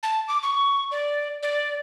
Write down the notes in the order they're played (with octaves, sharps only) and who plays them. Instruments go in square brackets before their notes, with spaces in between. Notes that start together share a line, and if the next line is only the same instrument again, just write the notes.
[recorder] A5
D6
C#6
D5
D5